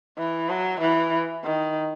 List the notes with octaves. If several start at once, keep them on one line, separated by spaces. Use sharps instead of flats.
E3
F#3
E3
D#3